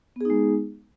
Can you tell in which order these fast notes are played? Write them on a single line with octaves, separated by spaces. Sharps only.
B3 G#4 D#4 G#3